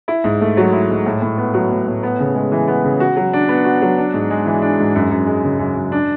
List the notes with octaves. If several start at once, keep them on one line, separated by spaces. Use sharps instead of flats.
E4
G#2
A3
F#3
E4
G#2
A2
A2
B3
F#3
A2
A2
B3
C#3
G#3
E3
B3
C#3
F#4
F#3
D4
B3
F#4
F#3
D4
G#2
G#3
E3
D4
G#2
F#2
F#2
G#3
C#3
F#2
F#2
D4